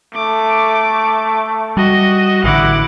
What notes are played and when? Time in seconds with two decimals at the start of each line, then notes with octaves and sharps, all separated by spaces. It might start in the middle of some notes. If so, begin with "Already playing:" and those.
0.15 A3 D6
1.77 G3 F#4 D#5
2.44 A1 D3 E4 F#5 D6